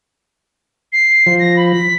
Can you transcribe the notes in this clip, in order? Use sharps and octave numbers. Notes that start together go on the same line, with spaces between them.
C7
F3
A#6
B5
B6